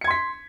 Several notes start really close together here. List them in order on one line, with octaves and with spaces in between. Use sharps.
C#7 G#6 C6 B6